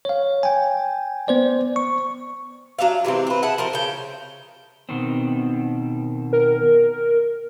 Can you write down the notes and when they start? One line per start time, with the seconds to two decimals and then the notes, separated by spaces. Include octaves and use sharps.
0.05 C#5 F5
0.43 G5 G#5
1.28 B3 C5 D5
1.76 C#6
2.79 F#3 D4 E5 F5
3.05 C3 E3 G#3 C4
3.27 C4 B4
3.43 G#4 E5 F#5 A5
3.58 F3 A#4 C5
3.73 C#3 G5
4.89 B2 D#3 C4
6.33 A#4